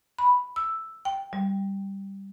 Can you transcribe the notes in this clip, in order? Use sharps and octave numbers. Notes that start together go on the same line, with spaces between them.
B5
E6
G5
G3